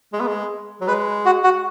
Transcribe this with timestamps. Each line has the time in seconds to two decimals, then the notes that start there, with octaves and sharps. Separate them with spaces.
0.13 G#3
0.20 B3
0.27 G#3
0.81 F#3
0.87 G#3 B4
1.25 F#4
1.44 F#4